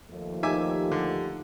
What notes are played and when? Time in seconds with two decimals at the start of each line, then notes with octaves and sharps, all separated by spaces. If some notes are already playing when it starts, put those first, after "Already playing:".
0.10 D#2 F3 A3
0.43 D#4 G4 E5 G#5 D6
0.92 D3